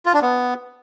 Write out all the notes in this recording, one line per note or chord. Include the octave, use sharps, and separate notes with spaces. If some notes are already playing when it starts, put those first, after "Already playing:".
F4
D4
B3